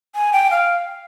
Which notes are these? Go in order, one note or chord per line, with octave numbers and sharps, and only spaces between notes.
G#5
G5
F5